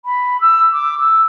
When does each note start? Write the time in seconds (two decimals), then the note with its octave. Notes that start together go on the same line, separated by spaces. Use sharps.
0.05 B5
0.41 E6
0.72 D6
0.99 E6